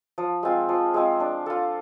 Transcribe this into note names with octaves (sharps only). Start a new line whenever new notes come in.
F3
G#3 C4 F4
F3
G#3 C4 F4
D4
F4 A4